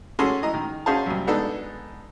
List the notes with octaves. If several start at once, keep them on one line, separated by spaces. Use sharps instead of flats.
C#4 F#4 G#4 A4 A5 C6
E3 D#5 A#5
D#3
C#4 F#4 G#4 C5 F5 A5
C2 F#2
G#3 B3 D4 D#4 A4